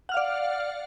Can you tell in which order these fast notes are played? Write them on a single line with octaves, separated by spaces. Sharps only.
F#5 F6 F5 D5